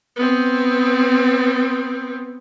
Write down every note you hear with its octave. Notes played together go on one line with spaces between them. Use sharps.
B3 C4